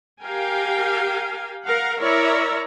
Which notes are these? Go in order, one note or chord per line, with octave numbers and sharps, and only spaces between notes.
G4 A#4 F5 G5 G#5
A#4 F5 F#5
E4 A#4 C#5 D5 E5 A#5